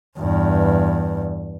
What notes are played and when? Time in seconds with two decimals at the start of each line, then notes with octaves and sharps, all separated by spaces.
0.19 E2 G2